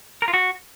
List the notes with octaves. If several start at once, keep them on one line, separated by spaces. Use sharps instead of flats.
A#4
F4
F#4